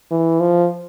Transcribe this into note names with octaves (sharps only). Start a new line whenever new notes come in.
E3
F3